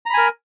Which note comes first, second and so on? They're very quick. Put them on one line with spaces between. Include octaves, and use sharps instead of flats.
A#5 B5 G#5 A#4